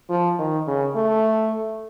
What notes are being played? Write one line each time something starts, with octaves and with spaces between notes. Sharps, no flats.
F3
D#3
C#3
A3